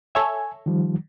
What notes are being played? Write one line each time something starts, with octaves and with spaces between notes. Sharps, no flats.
A4 C#5 E5 G#5
D#3 F3 G3